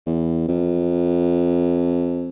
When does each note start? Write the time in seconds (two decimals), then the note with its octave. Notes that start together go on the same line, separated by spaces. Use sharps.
0.06 E2
0.48 F2